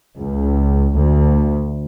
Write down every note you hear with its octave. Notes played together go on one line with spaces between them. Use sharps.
C#2
D2